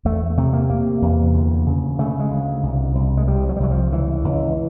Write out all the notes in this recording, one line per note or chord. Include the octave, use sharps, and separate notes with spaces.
E2 A3
C3 A3
A#3
C3 A#3
E2
D2
C#3
C#3 A3
G#3
D2
C2
C2
G#3
C3 G3
F#3
G3
C2 F#3
F3
C#2 E3
C#2